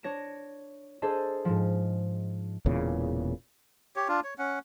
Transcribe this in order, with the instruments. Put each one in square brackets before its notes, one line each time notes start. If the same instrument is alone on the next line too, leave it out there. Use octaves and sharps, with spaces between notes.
[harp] D4 C#5 A#6 D7 E7
D4 G#4 A4 C5 D#5
G#2 F3
[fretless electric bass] E1 E2 A#2 C#3
[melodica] G4 C#5
D4 F4
C#5
C#4 F#5